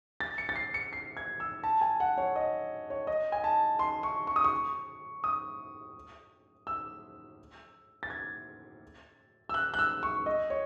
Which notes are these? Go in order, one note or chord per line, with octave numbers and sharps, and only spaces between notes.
A6
C#7
A6
C7
C#7
C7
G#6
E6
A5
G#5
F#5
C#5
D#5
C#5
D#5
G#5
A5
C6
C#6
C#6
D#6
C#6
D#6
E6
A6
G#6
E6
F#6
F#6
E6
C#6
D#5
C#5